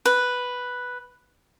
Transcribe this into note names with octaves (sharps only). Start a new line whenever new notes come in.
B4